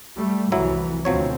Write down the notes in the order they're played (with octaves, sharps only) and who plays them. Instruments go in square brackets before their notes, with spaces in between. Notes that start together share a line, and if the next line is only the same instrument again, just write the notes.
[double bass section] G3 A3
[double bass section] C2 F2 E3 [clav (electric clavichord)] F#3 E4
[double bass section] D2 B2 C4 [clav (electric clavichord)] F3 F#3 C#5